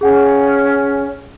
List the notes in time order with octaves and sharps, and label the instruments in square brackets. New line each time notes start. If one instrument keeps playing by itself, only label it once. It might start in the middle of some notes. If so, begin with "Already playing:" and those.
[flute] C#4 [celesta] G#4 F#5 G#5